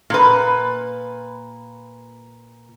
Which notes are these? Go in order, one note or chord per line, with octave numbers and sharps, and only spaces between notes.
A#2 B4